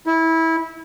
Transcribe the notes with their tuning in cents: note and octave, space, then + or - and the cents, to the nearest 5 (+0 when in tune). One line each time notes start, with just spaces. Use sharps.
E4 -20